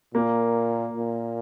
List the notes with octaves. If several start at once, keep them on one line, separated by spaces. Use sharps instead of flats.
A#2 A#3
A#2